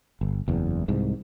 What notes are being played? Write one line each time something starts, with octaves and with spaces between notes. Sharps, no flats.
G1
F#1 E2
C2 G#2